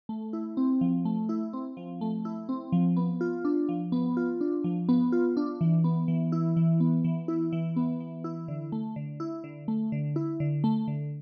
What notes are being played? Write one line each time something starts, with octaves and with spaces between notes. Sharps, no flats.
A3
E4
C4
F3
A3
E4
C4
F3
A3
E4
C4
F3
B3
F4
D4
F3
B3
F4
D4
F3
B3
F4
D4
E3
B3
E3
E4
E3
B3
E3
E4
E3
B3
E3
E4
D3
A3
D3
E4
D3
A3
D3
E4
D3
A3
D3